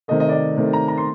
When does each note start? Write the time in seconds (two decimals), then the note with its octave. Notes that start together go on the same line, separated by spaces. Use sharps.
0.08 C3 D#3 A3 D#5
0.20 D#5
0.29 D5
0.32 D#5
0.57 C3 D#3 A3
0.73 A#5
0.88 A#5
0.97 C6